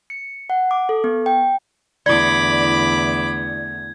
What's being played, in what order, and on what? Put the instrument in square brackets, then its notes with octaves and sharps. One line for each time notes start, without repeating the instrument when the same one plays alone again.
[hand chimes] C#7
F#5
D6
A4
B3
G5
[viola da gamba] E2 D3 A3 [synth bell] E4 D5 [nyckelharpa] B5 D6 [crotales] G#6